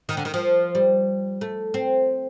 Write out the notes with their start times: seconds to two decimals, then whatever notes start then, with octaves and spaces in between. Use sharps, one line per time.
0.09 D#3
0.17 D3
0.25 D#3
0.34 F3
0.75 G3
1.41 A3
1.74 C4